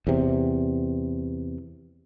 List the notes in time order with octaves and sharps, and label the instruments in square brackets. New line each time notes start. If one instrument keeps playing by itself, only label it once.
[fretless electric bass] E2 C3